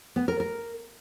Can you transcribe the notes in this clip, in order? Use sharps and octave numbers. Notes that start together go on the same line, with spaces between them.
B3
A#4
A#4